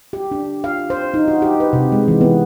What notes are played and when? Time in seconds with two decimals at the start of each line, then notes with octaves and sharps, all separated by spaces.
0.13 G4
0.31 D4
0.64 F5
0.90 C5
1.14 D#4
1.28 F#4
1.42 G4
1.60 B4
1.73 C3
1.92 G#3
2.08 E3
2.21 B3